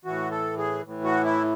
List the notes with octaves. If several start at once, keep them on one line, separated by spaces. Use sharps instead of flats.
A2 E3 F#4
A4
G#4
A2 E3
F#4
E4